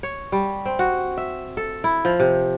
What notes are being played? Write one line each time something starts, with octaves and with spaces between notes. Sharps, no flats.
C#5
G3
C4
F#4
E5
A4
E4
F3
C3